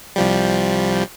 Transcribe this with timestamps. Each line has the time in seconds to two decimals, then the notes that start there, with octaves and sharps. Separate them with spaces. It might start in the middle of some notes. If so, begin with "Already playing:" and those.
0.16 C2 F3 G3